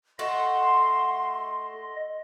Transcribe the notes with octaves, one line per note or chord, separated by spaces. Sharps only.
A3 F#4 D#5 C6